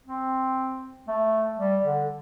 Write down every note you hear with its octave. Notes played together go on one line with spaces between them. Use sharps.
C4
A3
G3
D3